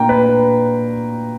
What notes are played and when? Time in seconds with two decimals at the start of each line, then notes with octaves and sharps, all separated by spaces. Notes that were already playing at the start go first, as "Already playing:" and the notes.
Already playing: A#2 A#3 D4 G5 A#5
0.09 B4